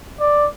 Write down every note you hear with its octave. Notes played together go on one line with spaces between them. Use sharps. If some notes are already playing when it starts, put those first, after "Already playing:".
D5